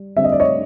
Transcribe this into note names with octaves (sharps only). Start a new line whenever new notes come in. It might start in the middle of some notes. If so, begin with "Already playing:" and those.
Already playing: G3
D3 G3 C4 E5
D#5
D5
C#5 D#5